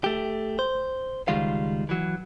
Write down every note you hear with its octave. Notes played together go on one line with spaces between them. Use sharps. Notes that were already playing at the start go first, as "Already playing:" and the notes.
A3 G4
C5
C#2 D#3 G3 G#3 F4 F5
E3 F#3